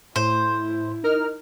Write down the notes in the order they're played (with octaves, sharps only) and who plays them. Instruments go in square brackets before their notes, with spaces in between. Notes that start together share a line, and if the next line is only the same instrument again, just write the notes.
[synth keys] A2 [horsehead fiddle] E4 [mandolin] C5
[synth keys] D#4 A#4 F6